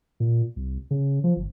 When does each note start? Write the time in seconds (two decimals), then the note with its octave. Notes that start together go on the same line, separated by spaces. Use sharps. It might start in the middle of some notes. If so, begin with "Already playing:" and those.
0.20 A#2
0.56 C2
0.91 C#3
1.24 F3
1.36 G1